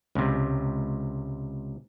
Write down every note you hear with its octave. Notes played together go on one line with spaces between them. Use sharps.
C#2 C3